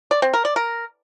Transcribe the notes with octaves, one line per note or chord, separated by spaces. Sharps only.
D5
C4
A#4
D5
A#4